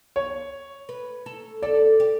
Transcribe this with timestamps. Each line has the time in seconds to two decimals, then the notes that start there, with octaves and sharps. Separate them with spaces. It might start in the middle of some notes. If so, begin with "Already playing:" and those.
0.16 C#5
0.89 B4
1.26 A4
1.62 A4 D5
2.00 G4